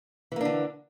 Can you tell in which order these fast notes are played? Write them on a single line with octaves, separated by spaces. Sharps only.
E3 A#3 D4 D3